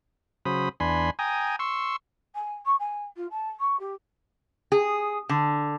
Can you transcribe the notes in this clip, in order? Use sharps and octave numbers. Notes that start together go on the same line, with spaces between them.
C#3 F#3 C5 B5 D#6
E2 D4 G#5 B5 C6
G5 G#5 A#5 D#6
C6 C#6 E6
G#5
C#6
G#5
F4
A5
C#6
G4
G#4
D3